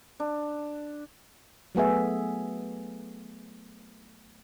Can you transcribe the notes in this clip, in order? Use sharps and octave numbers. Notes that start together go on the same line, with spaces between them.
D4
F#3 A3 B3 G#4 E5